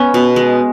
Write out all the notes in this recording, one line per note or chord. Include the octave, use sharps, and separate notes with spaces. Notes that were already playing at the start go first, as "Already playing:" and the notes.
Already playing: G#3 B3 C#4
B2
G#3